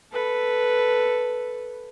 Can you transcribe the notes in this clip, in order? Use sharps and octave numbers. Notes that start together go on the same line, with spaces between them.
A4 B4